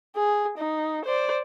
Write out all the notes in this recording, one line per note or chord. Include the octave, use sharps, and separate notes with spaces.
G#4
D#4
C5 D5